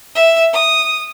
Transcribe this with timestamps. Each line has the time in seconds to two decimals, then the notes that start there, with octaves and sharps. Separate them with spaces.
0.15 E5
0.53 D#6